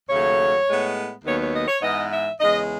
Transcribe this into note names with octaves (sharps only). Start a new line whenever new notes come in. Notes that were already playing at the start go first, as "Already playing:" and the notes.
D#2 C#3 F#3 A3 C#5
A2 G#3 B3
D#2 D#3 F#3 B3 C#5
C#5
D#5
C#5
G#2 E3 B3 D#5
E5
E2 C#3 G#3 D#5